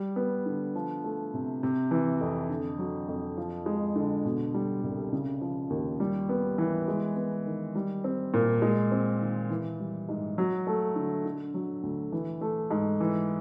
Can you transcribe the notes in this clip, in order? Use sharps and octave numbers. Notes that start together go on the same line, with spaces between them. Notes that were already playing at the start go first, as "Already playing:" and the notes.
Already playing: G3
B3
D3
F3
A3
C3
C3
E3
F2
D3
F#3
F2
F3
G#3
D3
B2
G3
C2
C#3
F3
D#2
G3
B3
E3
G#3
B3
D#3
G3
C4
A#2
G#3
C4
D#3
E3
G3
G#2
F#3
A3
D3
D3
F#3
D2
E3
A3
G#2
E3